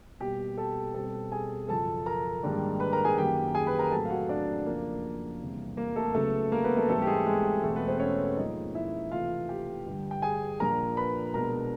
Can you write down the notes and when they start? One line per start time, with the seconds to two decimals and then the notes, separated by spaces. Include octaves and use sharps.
0.20 B2 G3 A#3 G4 G5
0.57 A4 A5
0.94 B2 G3 C4 A4 A5
1.32 G#4 G#5
1.68 F#2 C#3 F3 A4 A5
2.06 A#4 A#5
2.43 G#2 D#3 G3 A#3 D4
2.80 B4 B5
2.93 A#4 A#5
3.05 G#4 G#5
3.18 F#2 D#3 F#3 A#3 G4 G5
3.55 G#4 G#5
3.67 B4 B5
3.79 A#4 A#5
3.91 A2 F#3 A3 C4 A4 A5
4.05 F5
4.10 F#4 F#5
4.29 D4 D5
4.66 F2 C#3 F3 A#3 A#4
5.40 E2 C3 E3 G3
5.77 A#3 A#4
5.96 A3 A4
6.14 C#2 C#3 F#3 A3 B3 A4
6.52 A#3 A#4
6.64 B3 B4
6.77 A3 A4
6.88 G#2 E3 G3 A3 C4 A4
7.02 G4
7.07 G#3 G#4
7.26 G#3 G#4
7.63 E2 B2 G#3 A3 C4 A4
7.76 B3 B4
7.88 C4 C5
8.00 C#4 C#5
8.37 G#2 F3 A#3 D#4 D#5
8.75 E4 E5
9.11 C3 E3 A3 F4 F5
9.49 G4 G5
9.86 G2 D3 G3
10.11 G5
10.22 G#4 G#5
10.60 A#2 F3 A#3 D4 A#4 A#5
10.97 B4 B5
11.34 B2 G#3 B3 D4 A#4 A#5